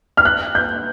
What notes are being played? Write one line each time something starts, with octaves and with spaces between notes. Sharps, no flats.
F6
F#6
G6